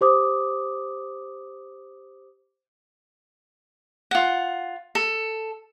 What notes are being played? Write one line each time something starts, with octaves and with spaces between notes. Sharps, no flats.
G4 C5 D6 D#6
F4 F#5
A4